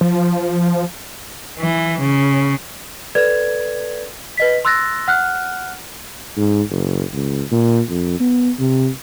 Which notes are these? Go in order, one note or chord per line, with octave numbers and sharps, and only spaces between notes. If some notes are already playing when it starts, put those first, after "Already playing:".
F3
E3
C#3
A4 B4 D5 G#6
B4 D#5 B6
C6 E6 F#6 A6 A#6
F#5 F6 F#6
G#2
F#1
C#2
A#2
F2
B3
C3